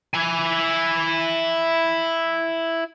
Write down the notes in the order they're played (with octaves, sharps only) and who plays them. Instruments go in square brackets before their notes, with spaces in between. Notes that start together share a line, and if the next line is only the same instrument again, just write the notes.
[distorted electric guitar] E4 G#5